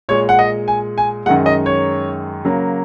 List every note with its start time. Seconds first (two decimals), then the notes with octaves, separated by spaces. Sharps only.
0.09 A#2 G#3 C#5
0.29 F#5
0.39 D#5
0.68 G#5
0.98 G#5
1.26 G#3 F#5
1.29 F#2 D#3
1.46 D#5
1.66 C#5
2.45 C#3 F#3 A#3